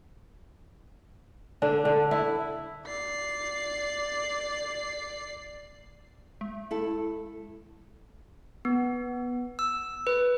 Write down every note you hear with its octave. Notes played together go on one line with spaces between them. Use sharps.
D3 D4
D3
E4
D5 C7
G#3
E4 A4
B3
E6
B4